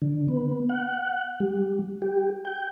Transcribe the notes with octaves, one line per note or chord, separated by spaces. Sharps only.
D3
B3
F#5
G3
G4
G5